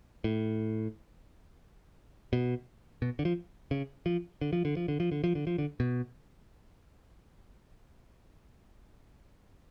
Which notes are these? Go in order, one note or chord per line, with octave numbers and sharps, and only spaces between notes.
A2
B2
B2
D3
F3
C#3
F3
D3
F3
D3
F3
D3
F3
D3
F3
D3
F3
D3
B2